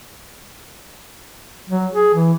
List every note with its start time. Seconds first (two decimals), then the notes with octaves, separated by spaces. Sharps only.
1.69 F#3
1.94 G#4
2.14 E3